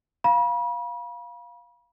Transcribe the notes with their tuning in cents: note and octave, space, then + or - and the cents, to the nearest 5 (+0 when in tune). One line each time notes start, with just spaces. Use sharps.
F5 +0 B5 -40